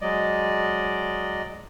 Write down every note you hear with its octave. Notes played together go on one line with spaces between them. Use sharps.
F#3 G#3 D5 D#5